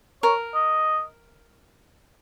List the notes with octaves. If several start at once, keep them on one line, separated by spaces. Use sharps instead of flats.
A#4 C#5
D#5